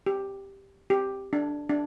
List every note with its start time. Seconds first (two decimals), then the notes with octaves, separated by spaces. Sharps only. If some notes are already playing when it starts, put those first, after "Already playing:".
0.06 G4
0.90 G4
1.33 D4
1.69 D4